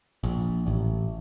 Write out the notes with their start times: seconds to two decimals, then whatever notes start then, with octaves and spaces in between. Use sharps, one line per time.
0.24 A#1
0.67 A1